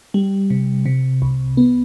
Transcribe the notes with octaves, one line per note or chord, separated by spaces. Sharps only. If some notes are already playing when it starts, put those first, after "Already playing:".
G3
C3
C3
C2
B3